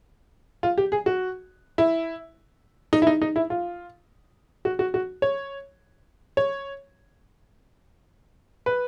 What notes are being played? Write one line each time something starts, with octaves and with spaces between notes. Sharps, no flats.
F4
G4
G#4
F#4
E4
D#4
E4
D#4
D#4
E4
F4
F#4
F#4
F#4
C#5
C#5
B4